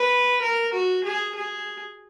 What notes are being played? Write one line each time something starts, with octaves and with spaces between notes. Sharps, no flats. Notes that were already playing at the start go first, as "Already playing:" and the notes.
Already playing: B4
A#4
F#4
G#4
G#4